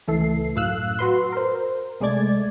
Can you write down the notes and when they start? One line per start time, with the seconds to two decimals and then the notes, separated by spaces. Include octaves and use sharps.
0.07 C#2 E3 A3 A4 C7
0.56 F#2 A2 F5 E6 F#6
0.99 F#4 B4 C6
1.32 A#4 C5
2.00 C2 G#3 A3 D5 G#6 A6